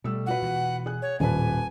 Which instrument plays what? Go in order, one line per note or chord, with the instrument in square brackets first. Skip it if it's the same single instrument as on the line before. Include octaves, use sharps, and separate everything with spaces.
[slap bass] B2 [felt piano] G3 A3 E6
[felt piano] F4 F#4 B4 [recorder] F#5
[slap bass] B2 E3
[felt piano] G#4 F#6
[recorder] C#5
[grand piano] D#1 [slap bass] A2 [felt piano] B4 A5 [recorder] G#5